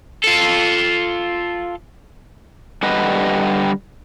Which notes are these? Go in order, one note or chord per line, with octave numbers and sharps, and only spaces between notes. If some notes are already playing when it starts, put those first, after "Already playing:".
F4 A4
D3 G3 G4 B4 D#5 F#5